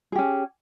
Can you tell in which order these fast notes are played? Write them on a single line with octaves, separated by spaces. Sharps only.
G#4 G4 C#4